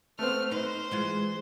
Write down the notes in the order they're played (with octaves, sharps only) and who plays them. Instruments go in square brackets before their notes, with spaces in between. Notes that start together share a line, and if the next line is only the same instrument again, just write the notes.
[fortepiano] A3 B3 C4 [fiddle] F6
[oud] D#4 B4 [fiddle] C5
[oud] E3 G#3 F4